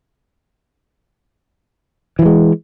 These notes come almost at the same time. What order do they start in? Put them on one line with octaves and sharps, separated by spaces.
E3 F3 G#3